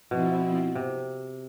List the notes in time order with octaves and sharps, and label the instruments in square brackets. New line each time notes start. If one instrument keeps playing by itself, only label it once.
[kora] B2 [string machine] F3 C4 E4
[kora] C3